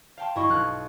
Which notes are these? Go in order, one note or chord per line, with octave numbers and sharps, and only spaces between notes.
F5 G5 A5 C6
G2 E4 F#4 D#5 C#6 C7
B1 F5 F6 F#6